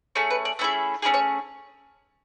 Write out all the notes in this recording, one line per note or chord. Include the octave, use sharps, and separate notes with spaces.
A3 C#4 G#4 A4
B4
D5
A3 C#4 E4 G#4 E5
A3 C#4 E4 G#4 D5
C#5